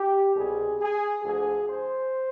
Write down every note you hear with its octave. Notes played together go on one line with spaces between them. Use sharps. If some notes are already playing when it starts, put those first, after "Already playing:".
Already playing: G4
C2 B2 G3 G#4
G#4
D2 D3 F3 G#4
C5